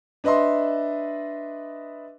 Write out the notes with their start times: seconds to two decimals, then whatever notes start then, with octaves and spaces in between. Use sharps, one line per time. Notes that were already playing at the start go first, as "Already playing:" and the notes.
0.24 D4 B4 D#5 E5 C6